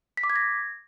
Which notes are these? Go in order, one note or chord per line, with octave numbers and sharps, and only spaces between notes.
B6
D6
G#6
A#6